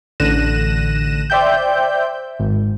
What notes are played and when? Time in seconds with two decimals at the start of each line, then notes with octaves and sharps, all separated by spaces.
0.20 A1 D3 F#6 A#6 D#7 E7
1.30 C5 D5 E5 G5 G6
2.39 G#1